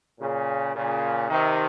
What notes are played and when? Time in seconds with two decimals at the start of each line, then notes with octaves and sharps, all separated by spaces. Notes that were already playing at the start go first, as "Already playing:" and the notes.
0.20 A#2 C#3
0.75 A#2 C#3
1.30 C3 D#3